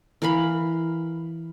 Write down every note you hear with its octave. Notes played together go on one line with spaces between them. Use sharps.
E3 A#4 F5 B5